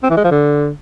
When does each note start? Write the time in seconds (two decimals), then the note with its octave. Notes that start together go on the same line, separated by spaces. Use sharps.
0.03 C4
0.10 E3
0.17 G#3
0.24 F3
0.31 D3